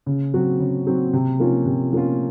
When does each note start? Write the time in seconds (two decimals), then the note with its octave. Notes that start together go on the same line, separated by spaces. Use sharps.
0.06 C#3
0.34 F#3 C4 F#4
0.60 C#3
0.87 F#3 C4 F#4
1.13 C3
1.40 F3 A#3 C#4 F4
1.66 C3
1.93 F3 A#3 C#4 F4